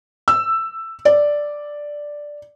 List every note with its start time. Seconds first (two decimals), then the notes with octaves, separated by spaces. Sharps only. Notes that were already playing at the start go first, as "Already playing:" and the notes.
0.28 E6
1.05 D5